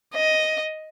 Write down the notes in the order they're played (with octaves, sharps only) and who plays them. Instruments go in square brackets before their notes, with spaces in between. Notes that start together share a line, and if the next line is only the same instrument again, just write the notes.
[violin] D#5